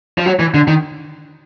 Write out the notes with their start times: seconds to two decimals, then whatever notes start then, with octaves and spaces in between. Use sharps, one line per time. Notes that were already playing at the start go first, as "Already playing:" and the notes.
0.18 F3
0.26 F#3
0.39 E3
0.54 D3
0.67 D#3